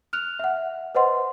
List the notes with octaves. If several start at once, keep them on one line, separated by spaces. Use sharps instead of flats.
F6 F#6 F7
E5 F#5
B4 C5 D#5 F#5 C6